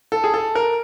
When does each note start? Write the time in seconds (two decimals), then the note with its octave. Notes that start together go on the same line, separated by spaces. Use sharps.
0.12 A4
0.24 G#4
0.34 A4
0.55 A#4